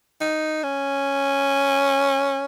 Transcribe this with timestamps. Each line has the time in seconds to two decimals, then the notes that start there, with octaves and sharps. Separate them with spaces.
0.21 D#4
0.63 C#4